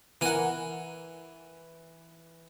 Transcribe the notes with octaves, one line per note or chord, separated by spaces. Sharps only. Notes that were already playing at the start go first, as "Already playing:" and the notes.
E3 A#4 F#5 G#5